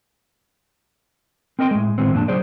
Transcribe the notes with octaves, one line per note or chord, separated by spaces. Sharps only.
C4 A#4 D#5 G5 C6
A2 G#3
A2 D#3 G#3 B3 C4
F2 A#2 D4 B4 A5
C#2 F#3 G#4 C5 D5